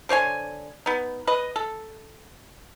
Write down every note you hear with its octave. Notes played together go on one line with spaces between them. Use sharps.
D3 C5 C#5 G#5
B3 D#4
B4 D#5
A4